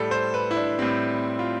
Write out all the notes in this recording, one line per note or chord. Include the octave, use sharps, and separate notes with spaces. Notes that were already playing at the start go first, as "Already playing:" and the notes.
Already playing: A2 G3 A4
C5
B4
E4
D4
A2 G3 C4
F4